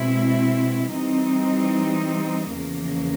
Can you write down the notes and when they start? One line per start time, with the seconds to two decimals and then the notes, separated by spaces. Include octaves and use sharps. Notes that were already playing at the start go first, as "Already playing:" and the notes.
Already playing: B2 G#3 C4 E4
0.94 E3 G3 C4 D#4
2.52 E2 C#3 F3 A#3